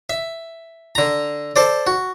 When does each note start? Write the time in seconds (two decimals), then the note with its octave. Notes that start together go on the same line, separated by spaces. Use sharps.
0.10 E5
0.95 D3 A#5
1.56 A4 C5 D5
1.87 F#4